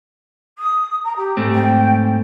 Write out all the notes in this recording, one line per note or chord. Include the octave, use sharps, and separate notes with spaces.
D#6
A#5
G4
G#2 A3 C4
G5